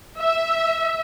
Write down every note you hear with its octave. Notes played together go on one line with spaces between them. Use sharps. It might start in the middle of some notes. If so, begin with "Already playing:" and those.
E5